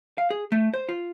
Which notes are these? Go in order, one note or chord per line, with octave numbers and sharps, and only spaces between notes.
F5
G#4
A3
C5
F4